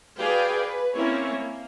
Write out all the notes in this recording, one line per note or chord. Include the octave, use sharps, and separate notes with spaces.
F#4 G#4 B4 D5 F5 G5
B4
A#3 C4 C#4 E4 C#5
A#3